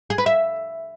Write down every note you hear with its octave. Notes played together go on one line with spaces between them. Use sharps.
G#4
B4
E5